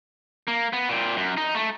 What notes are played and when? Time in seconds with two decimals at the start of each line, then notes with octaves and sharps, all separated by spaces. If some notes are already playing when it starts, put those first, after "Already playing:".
0.48 A#3
0.73 B3
0.89 A#2 C4
1.17 F#2
1.37 D#4
1.55 A3